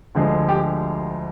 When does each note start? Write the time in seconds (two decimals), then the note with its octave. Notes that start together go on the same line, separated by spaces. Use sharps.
0.15 D2 D3 F3 G#3
0.49 G4